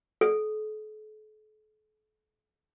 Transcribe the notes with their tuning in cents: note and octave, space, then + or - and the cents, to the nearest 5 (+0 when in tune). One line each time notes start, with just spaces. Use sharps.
A4 -40